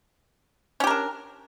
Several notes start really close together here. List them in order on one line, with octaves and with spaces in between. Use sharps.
C#4 G4 A#4 D4